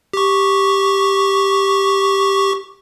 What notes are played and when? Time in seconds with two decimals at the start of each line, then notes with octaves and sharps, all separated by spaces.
0.13 G4 C#6